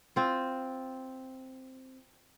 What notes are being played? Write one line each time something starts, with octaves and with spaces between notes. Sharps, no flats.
C4 F4